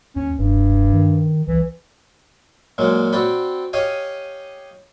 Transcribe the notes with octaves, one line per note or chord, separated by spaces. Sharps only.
D#2 C#4
F1 G2
D#3
C2 E3
A#2 F#3 G#3 A#3
C4 F#4 D5 G5 B5
G4 C#5 D#5 F5 G#5